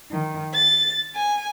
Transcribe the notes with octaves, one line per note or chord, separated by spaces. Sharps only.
D#3
A6
G#5